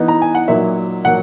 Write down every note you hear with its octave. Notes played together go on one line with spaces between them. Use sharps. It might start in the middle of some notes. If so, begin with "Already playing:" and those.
Already playing: E3 B3 D#4
A#5
G#5
F#5
A#2 F#3 A#3 D#4 E5
A#2 F#3 A#3 F#5